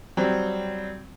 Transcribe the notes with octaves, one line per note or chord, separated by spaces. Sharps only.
F#3 G3 C4